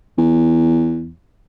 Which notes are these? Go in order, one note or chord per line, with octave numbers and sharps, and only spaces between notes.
E2